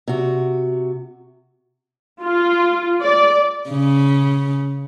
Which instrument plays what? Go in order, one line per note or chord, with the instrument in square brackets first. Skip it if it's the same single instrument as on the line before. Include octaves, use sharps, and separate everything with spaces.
[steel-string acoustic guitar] C3 F#4
[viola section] F4
D5
[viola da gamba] C#3